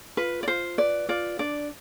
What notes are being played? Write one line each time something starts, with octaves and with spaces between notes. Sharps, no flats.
F4 B4
D5
F4 C5
B4 D5
F4 D5
D4 D5